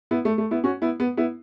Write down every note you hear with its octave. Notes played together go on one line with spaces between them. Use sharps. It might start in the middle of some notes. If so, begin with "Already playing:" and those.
B3 E4
A3
A3
B3 E4
C#4 F#4
B3 E4
B3
B3 E4